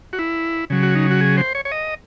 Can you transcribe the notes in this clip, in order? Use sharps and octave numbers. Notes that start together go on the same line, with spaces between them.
F#4
E4
C#3 F#3
F#4
D#4
F#4
G#4
C5
C#5
C#5
D#5